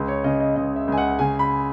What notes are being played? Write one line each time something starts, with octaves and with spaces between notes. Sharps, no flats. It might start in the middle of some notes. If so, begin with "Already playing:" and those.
Already playing: C#2
C#5
C#3 D#5
D#5
C#2 D#5
E5
C#2 G#5
F#5
C#3 G#5
B5